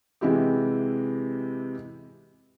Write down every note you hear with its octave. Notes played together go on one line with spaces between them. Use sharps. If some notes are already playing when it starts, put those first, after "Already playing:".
C3 E3 G#3 E4 F#4 G4